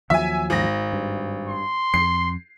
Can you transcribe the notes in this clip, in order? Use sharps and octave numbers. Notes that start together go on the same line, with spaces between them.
D#2 F3 F#3 E5 G#5
G#1 A#6
G2
C6
F2 C7